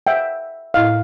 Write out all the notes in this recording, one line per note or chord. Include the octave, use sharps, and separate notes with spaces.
E5 F#5 G5
A2 E4 D#5 F5